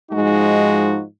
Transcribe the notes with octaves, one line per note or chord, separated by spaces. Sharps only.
G#2 F3 G#3 D#4 F#4